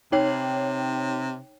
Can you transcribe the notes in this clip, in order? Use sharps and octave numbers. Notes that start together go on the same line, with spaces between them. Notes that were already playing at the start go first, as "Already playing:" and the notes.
C3 D#4 C#5 G5